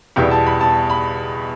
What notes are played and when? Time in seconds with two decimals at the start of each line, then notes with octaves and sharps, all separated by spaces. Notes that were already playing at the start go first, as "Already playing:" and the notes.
0.16 E2 B2 G3 B3 E4 G5
0.31 A5
0.46 B5
0.61 A5
0.90 B5